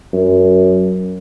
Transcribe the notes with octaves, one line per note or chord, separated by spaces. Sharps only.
F#2